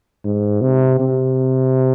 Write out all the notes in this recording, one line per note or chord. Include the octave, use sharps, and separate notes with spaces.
G#2
C3
C3